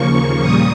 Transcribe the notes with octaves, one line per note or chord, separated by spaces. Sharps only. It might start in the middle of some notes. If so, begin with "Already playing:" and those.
Already playing: D#2 C#3 F3 A#3 C#6
A#2 G3 A#3 D#6